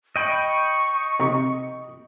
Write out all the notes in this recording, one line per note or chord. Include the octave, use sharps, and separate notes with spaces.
D#5 G5 B5 C#6
C3 D#4